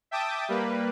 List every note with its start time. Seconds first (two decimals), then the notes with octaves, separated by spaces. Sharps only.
0.11 E5 G5 A5 D6 D#6
0.49 G3 A#3 B4